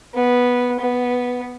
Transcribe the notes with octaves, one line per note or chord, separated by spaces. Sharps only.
B3
B3